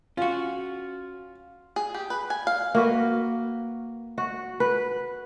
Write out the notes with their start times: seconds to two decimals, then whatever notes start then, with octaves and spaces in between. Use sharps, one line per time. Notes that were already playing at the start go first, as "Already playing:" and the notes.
0.17 C#4 F4 F#4
1.76 G#4
1.95 G4
2.10 B4
2.30 G#5
2.47 F5
2.75 A#3 F#4 B4
4.18 F#4
4.60 B4